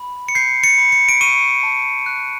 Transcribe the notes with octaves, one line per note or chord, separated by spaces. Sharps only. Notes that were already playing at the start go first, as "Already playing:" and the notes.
Already playing: B5
C#7
G6 C7
C#7
B5
C#7
D7
C#6 D#7
A5
F#6